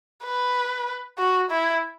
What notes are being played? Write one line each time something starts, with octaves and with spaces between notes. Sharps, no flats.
B4
F#4
E4